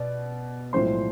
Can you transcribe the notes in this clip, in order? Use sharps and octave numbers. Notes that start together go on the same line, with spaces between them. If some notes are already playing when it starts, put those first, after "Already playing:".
Already playing: B2 D5
B1 A2 F3 G#3 C5 C6